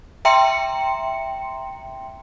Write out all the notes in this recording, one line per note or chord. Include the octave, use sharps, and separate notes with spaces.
E5 G5 A#5 C6 C#7